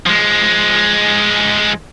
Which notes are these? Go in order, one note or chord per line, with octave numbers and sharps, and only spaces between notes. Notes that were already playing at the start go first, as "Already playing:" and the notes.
F3 G#3